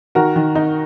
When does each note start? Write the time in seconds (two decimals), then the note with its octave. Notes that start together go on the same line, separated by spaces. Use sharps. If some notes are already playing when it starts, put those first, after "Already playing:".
0.15 D#3 F#4 A#4
0.36 D#3
0.55 D#4